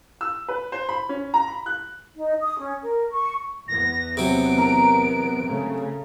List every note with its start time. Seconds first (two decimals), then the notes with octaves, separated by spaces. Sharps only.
0.21 E6
0.49 B4
0.72 C5
0.89 B5
1.09 C#4
1.34 A#5
1.48 B5
1.66 F#6
2.16 D#4
2.41 D#6
2.59 C#4
2.82 A#4
3.11 C#6
3.68 E2 B3 A#6
4.17 C3 F#3 D7
4.58 A#4
5.45 C#3 A3